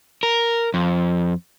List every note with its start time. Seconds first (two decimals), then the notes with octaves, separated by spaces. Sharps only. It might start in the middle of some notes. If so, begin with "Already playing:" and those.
0.23 A#4
0.74 F2